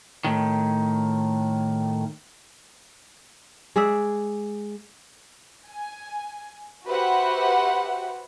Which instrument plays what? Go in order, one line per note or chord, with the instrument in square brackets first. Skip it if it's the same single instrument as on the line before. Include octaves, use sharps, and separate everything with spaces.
[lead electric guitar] A2 D#3
[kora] G#3 G#4 D5 E5
[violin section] G#5
F#4 G4 B4 C5 E5 F#5